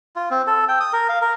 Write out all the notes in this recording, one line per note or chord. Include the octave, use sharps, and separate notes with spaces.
F4
C4
A4
G5
D#6
A#4
F5
A#4